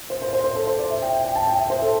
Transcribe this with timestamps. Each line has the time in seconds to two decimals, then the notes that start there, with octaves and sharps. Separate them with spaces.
0.10 C5
0.22 C5
0.33 C5
0.44 C5
0.56 A4
0.67 C5
0.78 D5
0.90 E5
1.02 G5
1.13 G5
1.25 G5
1.35 A5
1.47 G5
1.58 E5
1.70 C5
1.82 A4